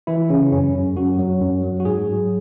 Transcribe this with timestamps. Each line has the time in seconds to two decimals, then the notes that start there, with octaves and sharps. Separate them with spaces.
0.07 E3 E4
0.30 C#3 C#4
0.52 F#2 C#4
0.74 F#2
0.96 F#2 F#4
1.19 F#3
1.41 F#2
1.63 F#3
1.80 F#4
1.85 G#2 G#4
2.07 F#3